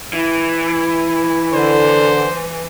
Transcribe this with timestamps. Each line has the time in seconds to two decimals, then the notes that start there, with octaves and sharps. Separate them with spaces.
0.13 E3 E4
1.53 D3 C5